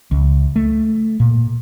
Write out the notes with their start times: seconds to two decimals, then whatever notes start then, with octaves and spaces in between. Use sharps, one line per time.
0.11 C#2
0.56 A3
1.20 A#2